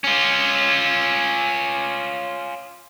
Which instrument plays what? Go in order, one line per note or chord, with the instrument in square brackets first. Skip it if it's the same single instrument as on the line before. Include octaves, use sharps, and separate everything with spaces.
[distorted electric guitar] C#4 F4